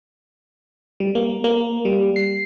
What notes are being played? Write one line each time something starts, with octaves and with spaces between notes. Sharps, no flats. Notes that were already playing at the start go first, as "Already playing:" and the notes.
G3
A#3
A#3
G3
C7